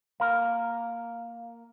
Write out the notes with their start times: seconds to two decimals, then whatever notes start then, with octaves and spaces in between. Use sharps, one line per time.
0.20 A#3 A#4 F5